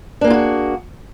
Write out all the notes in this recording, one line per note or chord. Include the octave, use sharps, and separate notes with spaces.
A#3 D4 F4 F#4 G#4